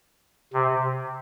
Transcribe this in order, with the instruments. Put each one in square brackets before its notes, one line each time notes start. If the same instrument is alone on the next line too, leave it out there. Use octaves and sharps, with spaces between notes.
[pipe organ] C3